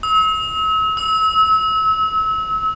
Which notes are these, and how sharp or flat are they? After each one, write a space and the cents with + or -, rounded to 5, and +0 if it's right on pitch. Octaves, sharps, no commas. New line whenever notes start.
E6 -40
E6 -30